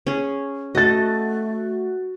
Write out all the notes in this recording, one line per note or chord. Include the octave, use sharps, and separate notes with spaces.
C#4 G#4
A3 F#4 A4 D#5 A6